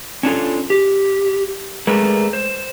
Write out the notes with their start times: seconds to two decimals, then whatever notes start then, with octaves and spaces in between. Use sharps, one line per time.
0.23 C#4 D4 F4 A4
0.70 G4
1.87 G#3 A3 A#4 B4 D5
2.33 C5